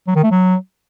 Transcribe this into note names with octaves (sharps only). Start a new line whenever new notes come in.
F#3
D#3
A3
F#3